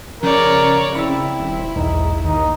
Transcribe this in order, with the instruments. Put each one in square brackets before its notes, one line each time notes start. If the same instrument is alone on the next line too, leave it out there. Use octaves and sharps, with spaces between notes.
[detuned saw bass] C#3 [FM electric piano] F3 [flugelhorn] A#4 [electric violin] C#5 D5
[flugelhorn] C4 [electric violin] E4 [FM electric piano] B5 E6
[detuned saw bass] D#1
[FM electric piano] B1 E2 [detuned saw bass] G#2 [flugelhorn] D#4
[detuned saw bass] D#2 [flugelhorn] D#4